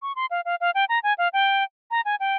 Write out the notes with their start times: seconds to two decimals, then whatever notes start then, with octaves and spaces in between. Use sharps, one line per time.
0.02 C#6
0.16 C6
0.31 F5
0.45 F5
0.61 F5
0.75 G5
0.89 A#5
1.03 G#5
1.18 F5
1.33 G5
1.91 A#5
2.05 G#5
2.20 G5